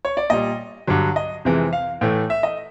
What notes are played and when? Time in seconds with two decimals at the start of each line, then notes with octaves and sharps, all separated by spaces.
0.05 C#5
0.17 D5
0.30 A#2 G3 D#5
0.87 G2 D3 F#3
1.16 D#5
1.45 F2 C3 E3 G#3
1.73 F5
2.01 A2 E3 A3
2.30 E5
2.43 D#5